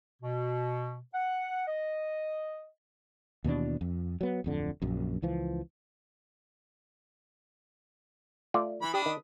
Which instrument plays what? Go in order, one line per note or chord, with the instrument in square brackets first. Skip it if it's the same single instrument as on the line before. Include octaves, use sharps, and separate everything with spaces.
[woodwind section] B2
F#5
D#5
[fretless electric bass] D#2 B2 E3 D4
F2
F#3 B3
D1 F2 D3
A#1 F#2
C#2 E3 F3
[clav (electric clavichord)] A3 F4 D5
[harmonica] E3 B5
[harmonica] D4 B5 D#6 [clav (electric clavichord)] G4
[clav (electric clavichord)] D#3